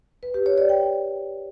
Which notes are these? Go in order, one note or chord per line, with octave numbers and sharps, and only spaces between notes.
B4
G4
C#5
D5
G5